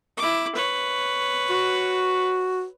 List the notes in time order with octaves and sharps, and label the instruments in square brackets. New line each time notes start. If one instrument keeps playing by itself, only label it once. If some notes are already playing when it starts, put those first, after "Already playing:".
[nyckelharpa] E4 D6
B4 C#5
[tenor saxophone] F#4